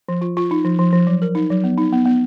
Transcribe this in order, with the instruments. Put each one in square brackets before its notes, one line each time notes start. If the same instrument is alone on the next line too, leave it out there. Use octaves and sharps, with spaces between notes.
[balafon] F3
F4
F4
D#4
F3
F3
F3
F#3
A#4
D#4
F#3
B3
D#4
B3
B3